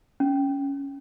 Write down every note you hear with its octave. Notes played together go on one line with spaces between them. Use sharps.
C#4